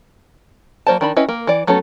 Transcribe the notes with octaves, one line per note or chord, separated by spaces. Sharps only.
F#3 A#3 C5 D5 A5
D#3 D4 B5
C#4 E4 B4 D#5
A#3
E3 D5
F#3 A3 B3 C#4 A4